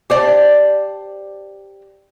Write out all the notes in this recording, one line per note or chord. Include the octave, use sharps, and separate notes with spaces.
G4 C5 D5 A5